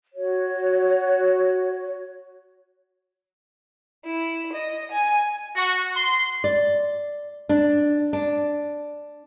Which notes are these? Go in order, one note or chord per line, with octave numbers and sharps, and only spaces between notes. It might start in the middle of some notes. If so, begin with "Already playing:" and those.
F#4 C#5
E4
D#5
G#5
F#4
C6
D5
D4
D4